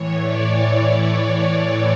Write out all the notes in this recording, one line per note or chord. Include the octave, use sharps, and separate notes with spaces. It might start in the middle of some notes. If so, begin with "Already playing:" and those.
Already playing: A2 E3 C#5
D5
D5